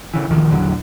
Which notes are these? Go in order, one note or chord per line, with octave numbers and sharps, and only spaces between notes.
C#3 E3
D2 A#2 D#3 F3
A#1 E2 D3 F#3